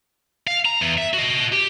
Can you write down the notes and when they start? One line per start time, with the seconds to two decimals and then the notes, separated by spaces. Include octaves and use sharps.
0.47 F5
0.65 A#5
0.81 E2
0.98 E5
1.14 F#4 D#5
1.52 G4